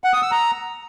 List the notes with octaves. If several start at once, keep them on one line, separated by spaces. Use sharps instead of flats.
F#5
D#6
E6
A#5